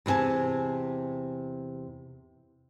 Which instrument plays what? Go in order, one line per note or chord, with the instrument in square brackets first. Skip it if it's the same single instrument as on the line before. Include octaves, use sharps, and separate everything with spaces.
[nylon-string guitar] E2 C3 B4 G#5 A5